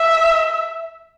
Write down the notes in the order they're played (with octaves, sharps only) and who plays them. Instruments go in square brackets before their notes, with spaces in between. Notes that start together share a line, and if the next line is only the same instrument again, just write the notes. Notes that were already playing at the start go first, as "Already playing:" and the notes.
Already playing: [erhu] E5